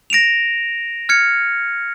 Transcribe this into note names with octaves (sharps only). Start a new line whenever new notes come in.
A#6 D7 E7 F7
F6 G#6 C#7